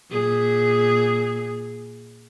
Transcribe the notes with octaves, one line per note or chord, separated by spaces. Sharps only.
A#2 G#4